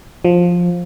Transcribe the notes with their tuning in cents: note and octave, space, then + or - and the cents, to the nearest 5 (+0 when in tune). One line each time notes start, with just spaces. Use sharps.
F3 +10